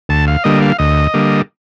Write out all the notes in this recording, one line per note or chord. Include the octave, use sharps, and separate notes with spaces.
D2 A5
F5
D3 G3 A#3 D#5
F5
D2 D#5
D3 G3 A#3